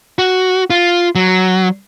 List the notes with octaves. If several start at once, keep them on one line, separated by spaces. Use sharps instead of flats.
F#4
F4
F#3